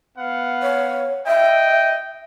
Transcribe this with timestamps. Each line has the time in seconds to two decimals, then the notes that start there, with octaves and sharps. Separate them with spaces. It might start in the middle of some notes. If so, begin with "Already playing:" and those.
0.17 B3 F5 F#5
0.62 C#5
1.27 D#5 E5 G5